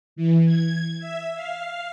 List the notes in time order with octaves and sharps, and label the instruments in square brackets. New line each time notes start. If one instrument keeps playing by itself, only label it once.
[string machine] E3
G#6
E5
F5